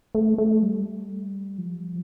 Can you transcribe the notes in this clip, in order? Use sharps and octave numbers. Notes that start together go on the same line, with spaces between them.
A3
A3
G3
F3